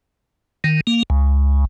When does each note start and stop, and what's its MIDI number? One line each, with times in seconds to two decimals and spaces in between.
0.64 0.81 51
0.87 1.03 58
1.10 1.65 37